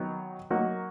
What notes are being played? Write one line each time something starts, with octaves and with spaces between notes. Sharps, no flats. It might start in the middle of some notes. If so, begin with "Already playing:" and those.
Already playing: D#3 F#3 B3 D#4
F#3 A#3 D#4 F#4 A#4